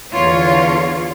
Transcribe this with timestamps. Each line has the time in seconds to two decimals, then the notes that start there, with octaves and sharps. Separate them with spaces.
0.14 E2 D3 F4 C#5